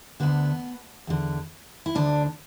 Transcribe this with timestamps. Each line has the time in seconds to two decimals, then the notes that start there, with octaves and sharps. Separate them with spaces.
0.20 D2 D3 B3
1.07 E2 D3
1.86 E4
1.95 D2 D3 D4